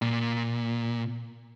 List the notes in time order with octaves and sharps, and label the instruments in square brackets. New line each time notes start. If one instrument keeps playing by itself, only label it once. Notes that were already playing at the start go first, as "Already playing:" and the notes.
[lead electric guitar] A#2